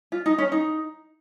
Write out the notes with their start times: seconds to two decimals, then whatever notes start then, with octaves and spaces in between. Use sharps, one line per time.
0.12 F4
0.26 D#4
0.38 C#4
0.52 D#4